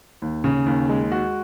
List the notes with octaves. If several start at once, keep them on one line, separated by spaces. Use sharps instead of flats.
D#2
C#3
D#2
G#3
F#4